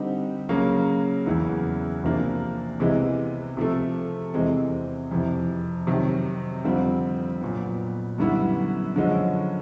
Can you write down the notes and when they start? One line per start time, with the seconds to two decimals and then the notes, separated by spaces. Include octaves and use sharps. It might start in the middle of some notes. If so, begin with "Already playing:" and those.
Already playing: D3 G3 C4 D#4 G4
0.49 C#3 F#3 A#3 C#4
1.26 E2 C#3 F#3 B3 E4
2.03 E2 C3 F3 A#3 D4
2.80 C3 E3 G#3 B3
3.57 C3 F3 A3
4.34 E2 C3 E3 G#3 C4
5.11 F2 C3 E3
5.87 C3 D#3 F#3
6.64 F2 D3 G3 C4 F4
7.41 A#2 F#3 B3
8.18 F#2 D3 G3 B3 E4
8.95 F#2 D3 F3 G#3 C#4